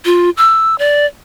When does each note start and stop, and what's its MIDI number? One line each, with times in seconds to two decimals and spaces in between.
0.05 0.30 65
0.37 0.78 88
0.79 1.06 74